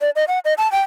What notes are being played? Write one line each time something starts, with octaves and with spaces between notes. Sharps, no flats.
D5
D#5
F#5
D#5
A5
G5